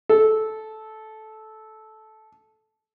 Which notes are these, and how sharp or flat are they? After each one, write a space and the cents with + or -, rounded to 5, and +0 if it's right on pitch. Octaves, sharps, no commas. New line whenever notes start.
A4 -15